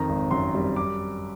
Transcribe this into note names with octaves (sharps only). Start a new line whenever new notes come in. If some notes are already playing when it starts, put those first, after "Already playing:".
Already playing: F2 D#3 A#5
G#1
F#2 C6
G3
D6